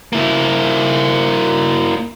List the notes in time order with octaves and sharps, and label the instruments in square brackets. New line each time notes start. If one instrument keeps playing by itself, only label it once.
[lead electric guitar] A#3 E4